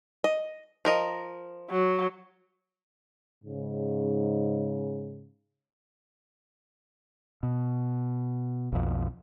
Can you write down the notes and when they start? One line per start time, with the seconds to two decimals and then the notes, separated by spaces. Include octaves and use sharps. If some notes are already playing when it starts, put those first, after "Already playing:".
0.24 D#5
0.85 F3 A#4 D#5
1.70 F#3
3.44 G#2 C#3
7.43 B2
8.72 B1 F2